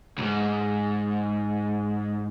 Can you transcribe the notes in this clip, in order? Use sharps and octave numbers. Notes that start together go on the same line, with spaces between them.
C#2 G#2